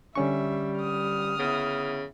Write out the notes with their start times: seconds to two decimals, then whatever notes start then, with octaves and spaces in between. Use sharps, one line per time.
0.15 D3 G3 C#4 E5 C#6
0.80 D#6 F6
1.39 C#3 B3 E4